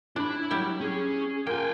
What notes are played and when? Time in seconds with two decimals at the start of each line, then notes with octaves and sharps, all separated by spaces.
0.16 D4 E4 B5
0.50 F#3 G3 E5 G5
0.81 C#4 G#4
1.47 A#3 F4 G5 G#5